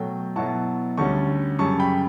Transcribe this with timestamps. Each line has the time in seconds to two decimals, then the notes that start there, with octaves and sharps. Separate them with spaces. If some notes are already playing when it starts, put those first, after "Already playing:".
Already playing: B2 F#3 A3 G5
0.36 B2 F#3 B3 E4 A5 C#6
0.97 D2 D3 G3 C#4 A5 C#6
1.59 F#2 C#3 G3 A5 C#6
1.79 G5 B5